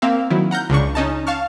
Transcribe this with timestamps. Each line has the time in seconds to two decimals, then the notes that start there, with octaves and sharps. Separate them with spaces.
0.02 A#3 C4 E5 F5
0.30 D#3 F#3 E4
0.51 F#5 A#5 F6 G6
0.70 C#2 C#3 D4 C#6
0.95 C#4 D#4 A5
1.27 F5 A5 C#6 F6